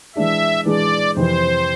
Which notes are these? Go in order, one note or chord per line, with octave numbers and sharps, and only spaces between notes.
E3 G#3 D4 G#4 E5
E3 G#3 D4 G#4 D5
F2 C3 E3 C5